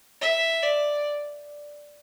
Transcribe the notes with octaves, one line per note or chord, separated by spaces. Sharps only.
E5
D5